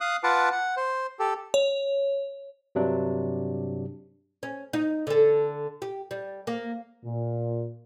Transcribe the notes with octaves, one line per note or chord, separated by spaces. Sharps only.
F5 D#6 F#6
F4 B4 F#5 A5 D6
F#5
C5
G4 A4
C#5
G2 C3 F#3 D4
C#4
D#4
D3 A4
G4
G3
A#3
A#2